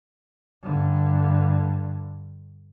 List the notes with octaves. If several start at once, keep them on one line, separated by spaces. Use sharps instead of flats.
G2 D3